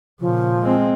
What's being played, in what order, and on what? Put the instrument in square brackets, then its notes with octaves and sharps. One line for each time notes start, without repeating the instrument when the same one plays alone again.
[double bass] A#2 C#3 [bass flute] F3
[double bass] G#3 C4